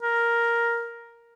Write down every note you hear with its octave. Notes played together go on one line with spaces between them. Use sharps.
A#4